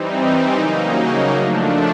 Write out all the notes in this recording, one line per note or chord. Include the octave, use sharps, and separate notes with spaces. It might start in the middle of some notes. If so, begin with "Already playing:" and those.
Already playing: E3 G3 C4 D#4
C#3 F#3 A#3 D#4
F3 A3 D4